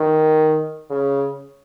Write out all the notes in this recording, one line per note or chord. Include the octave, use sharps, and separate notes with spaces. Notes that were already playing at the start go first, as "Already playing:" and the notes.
Already playing: D#3
C#3